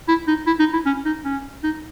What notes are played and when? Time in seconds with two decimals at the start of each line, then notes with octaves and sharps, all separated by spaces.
0.08 E4
0.27 D#4
0.47 E4
0.59 D#4
0.73 E4
0.86 C#4
1.05 D#4
1.25 C#4
1.63 D#4